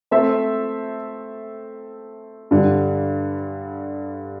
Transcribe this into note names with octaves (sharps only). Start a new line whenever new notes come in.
A3 C4 A4 C5 E5
G2 D3 G3